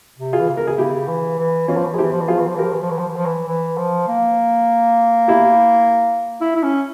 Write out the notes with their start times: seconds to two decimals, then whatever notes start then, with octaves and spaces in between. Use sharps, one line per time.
0.18 C3
0.33 F4 G#4
0.40 E3
0.49 C#3
0.57 A#4
0.67 G#4
0.78 C#3 E4 G4
1.08 E3
1.39 E3
1.68 E3 C#4 F4
1.77 F3
1.85 E3
1.94 F3 E4 G4 G#4
2.03 E3
2.12 F3
2.21 E3
2.28 F3 F4 G#4
2.38 E3
2.47 F3
2.55 E3 G4 A#4
2.64 F3
2.73 E3
2.82 F3
2.90 E3
2.99 F3
3.08 E3
3.16 F3
3.25 E3
3.48 E3
3.78 F3
4.08 A#3
5.28 E4 G4
6.41 E4
6.56 E4
6.63 C#4